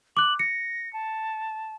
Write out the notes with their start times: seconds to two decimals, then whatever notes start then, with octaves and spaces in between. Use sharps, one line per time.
0.17 D6 F#6 F#7
0.39 A#6 C#7
0.93 A5